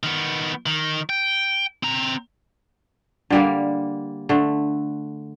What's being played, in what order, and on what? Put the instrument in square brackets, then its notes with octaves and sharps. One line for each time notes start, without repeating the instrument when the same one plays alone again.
[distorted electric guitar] D#3 B3
D#3
G5
C4 A#5
[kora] D3 G3 A#3
D3 A3